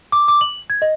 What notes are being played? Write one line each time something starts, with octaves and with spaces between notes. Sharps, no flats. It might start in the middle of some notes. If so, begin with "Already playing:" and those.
D6
D6
F#7
G#6
D#5